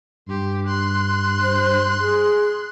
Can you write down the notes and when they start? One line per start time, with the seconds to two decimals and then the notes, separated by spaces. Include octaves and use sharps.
0.29 G2 G4 C6
0.66 C6 F#6
1.43 C5
2.00 G#4